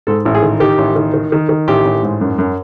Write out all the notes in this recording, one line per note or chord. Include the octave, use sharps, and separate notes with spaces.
G#2 A4
A1
G#4
D#3
D#3 G4
A1
D#3
D#3
D#3
D#3
A1 G4
A1
G#2
F#2
F#2